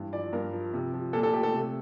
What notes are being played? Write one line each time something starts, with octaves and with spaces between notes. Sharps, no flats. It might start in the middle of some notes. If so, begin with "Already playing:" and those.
Already playing: G2 E3
F3 D5
G2 A#4
F3
C3
F3
A#2 A4
A4
A3 G4
A4
C3